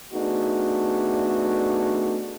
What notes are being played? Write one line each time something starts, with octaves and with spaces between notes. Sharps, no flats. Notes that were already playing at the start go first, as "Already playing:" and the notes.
A3 B3 D4 D#4 F#4 G#4